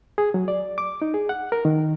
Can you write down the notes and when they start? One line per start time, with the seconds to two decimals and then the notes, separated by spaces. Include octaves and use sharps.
0.18 G#4
0.34 F#3
0.48 D5
0.78 D6
1.02 D#4
1.14 G#4
1.29 F#5
1.52 A#4
1.65 D#3